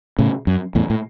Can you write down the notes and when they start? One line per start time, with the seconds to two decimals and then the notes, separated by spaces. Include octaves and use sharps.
0.19 A2 C#3
0.47 F#2
0.75 E2 A2
0.90 A2